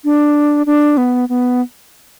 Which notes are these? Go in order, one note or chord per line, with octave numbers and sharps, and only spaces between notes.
D4
D4
B3
B3